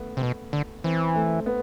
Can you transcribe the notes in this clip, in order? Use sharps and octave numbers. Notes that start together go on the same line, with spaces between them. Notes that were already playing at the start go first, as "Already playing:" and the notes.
Already playing: A3 B3
C3
B2
D3
E3 C4
A3
B3